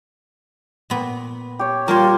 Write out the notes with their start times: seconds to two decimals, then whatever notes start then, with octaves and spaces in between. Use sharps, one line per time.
0.90 A#2 B3
1.59 G4 C#5
1.88 G3 A#3 F4 A#4 C#5 C6